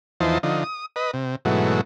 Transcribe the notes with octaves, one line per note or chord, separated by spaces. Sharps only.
E2 E3 F3 D#4 C5 A5
D3 F3 D#4
D#6
B4 D#5
C3
G#2 B2 E3 F#3 A3